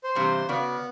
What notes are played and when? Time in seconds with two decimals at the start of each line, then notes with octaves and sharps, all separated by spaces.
0.04 C5
0.15 G2 C3 E3
0.49 C#3 B3 F#4 D5